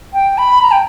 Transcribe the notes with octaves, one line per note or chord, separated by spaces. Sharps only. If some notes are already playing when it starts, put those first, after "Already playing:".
G5
B5
A#5
G5